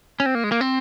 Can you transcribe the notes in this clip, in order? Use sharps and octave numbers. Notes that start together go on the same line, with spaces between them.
C#4
C4
A#3
G#3
A#3
C4